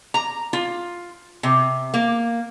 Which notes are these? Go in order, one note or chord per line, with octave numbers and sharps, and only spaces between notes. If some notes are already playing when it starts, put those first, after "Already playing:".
A#5
F4
C3
A#3